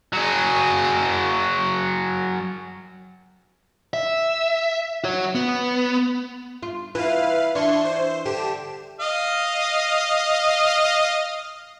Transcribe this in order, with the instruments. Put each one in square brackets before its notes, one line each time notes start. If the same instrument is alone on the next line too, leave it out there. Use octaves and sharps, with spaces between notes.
[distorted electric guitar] F#3 G#4
[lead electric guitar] E5
F#4 C#5
B3
[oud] F4
[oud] E3 F4 [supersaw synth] B4 F5
[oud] E3 [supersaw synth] D4 C6 C#6
[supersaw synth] C5
[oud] D3 [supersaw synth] G4 E7
[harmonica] D#5 F5